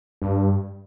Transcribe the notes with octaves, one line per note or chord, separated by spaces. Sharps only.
G2